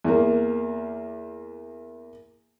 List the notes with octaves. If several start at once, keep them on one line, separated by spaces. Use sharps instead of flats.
E2 A#3